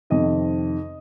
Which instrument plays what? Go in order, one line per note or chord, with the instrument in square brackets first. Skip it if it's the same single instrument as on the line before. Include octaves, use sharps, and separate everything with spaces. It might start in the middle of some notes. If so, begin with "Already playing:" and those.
[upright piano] F2 C3 D#3 D#5